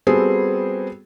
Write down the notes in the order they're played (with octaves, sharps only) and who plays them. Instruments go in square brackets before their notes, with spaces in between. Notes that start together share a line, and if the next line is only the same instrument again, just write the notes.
[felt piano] G3 B3 C4 F#4 G#4 A4